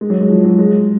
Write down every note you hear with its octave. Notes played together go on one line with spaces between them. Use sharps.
G#3
F#3
G#3
F3
F#3
G#3